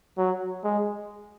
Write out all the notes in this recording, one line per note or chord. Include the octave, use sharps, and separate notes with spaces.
F#3
G#3